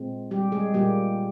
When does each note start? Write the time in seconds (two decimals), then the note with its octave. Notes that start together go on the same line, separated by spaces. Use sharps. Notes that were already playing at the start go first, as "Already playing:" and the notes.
Already playing: A#2 G#3 C4
0.31 G3 G4
0.52 G#3 G#4
0.74 A#2 G3 A#3 G4